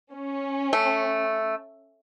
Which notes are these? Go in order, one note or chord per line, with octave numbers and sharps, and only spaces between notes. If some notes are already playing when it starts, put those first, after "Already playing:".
C#4
A3